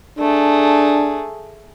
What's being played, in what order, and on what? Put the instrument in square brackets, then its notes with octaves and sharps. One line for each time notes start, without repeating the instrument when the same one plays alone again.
[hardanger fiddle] A3 G#4 [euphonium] D4